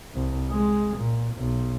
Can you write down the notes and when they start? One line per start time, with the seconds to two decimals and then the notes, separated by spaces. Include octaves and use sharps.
0.14 C2
0.50 G#3
0.97 A#2
1.36 B1